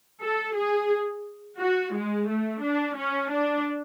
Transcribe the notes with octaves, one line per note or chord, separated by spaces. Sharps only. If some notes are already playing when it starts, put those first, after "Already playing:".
A4
G#4
F#4
G#3
A3
D4
C#4
D4